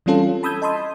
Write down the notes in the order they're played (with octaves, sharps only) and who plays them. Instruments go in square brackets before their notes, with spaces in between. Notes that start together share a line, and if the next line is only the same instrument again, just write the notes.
[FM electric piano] E3 G3 C4 C#4 F4 A4
A5 B5 D#6 E6 G6 G#6
D#5 A5 B5 C6 D#6